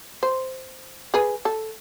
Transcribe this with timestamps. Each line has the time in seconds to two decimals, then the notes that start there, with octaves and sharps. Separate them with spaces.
0.23 C5
1.14 G#4 B4
1.45 A4